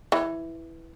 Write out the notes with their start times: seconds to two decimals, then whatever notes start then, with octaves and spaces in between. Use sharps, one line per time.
0.12 E3